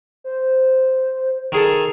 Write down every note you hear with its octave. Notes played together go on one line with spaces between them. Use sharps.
C5
D#3 G#4 A4